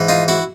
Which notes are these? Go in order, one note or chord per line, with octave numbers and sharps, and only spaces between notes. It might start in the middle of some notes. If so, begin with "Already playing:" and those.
Already playing: G#2 E3
D#4 F4
E4 F#4